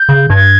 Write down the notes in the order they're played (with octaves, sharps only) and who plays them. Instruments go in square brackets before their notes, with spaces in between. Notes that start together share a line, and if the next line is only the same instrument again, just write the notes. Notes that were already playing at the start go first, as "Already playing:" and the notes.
Already playing: [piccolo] G6
[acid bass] C#3
[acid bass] G2 [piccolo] G#6